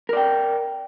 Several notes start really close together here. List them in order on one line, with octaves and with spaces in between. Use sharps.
A#4 D5 G5